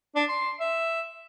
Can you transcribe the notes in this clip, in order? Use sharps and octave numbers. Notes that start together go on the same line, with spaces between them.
D4
C6
E5